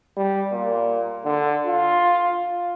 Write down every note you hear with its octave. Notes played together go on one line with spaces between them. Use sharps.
G3
A#2
D3
F4